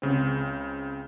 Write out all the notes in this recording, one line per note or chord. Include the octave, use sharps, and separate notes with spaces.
C#2 C#3 C4